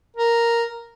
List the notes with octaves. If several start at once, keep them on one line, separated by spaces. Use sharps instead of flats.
A#4